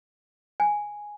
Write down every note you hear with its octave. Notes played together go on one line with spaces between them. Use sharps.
G#5